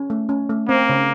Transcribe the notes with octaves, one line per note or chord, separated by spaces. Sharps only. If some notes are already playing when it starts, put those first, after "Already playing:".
Already playing: C#4
A3
C#4
A3
A#3 C4
C#3